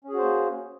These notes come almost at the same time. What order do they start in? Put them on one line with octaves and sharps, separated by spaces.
C#4 G#4 F#4 C5 A#3